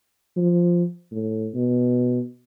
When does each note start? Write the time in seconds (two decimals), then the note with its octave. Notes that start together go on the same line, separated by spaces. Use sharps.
0.37 F3
1.12 A2
1.54 B2